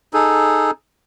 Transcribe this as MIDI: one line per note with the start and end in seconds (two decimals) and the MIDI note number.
0.14 0.71 63
0.14 0.71 68
0.14 0.71 69